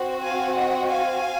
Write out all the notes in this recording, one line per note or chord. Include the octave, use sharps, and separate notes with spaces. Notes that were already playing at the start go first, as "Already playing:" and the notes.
Already playing: C4 F#4
F5 G#5
D#5 F#5
F5 G#5